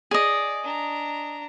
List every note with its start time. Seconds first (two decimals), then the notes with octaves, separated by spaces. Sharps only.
0.11 G#4 D5 D#5
0.64 D4 A#5